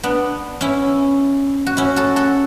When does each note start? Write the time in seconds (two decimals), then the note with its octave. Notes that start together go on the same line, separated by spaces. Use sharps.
0.03 B3 D4
0.61 C#4 E4
1.66 F#4
1.77 C#4 E4
1.96 F#4 A4
2.16 F#4 A4